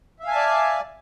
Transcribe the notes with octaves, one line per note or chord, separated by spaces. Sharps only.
D5 E5 F5 G#5 A5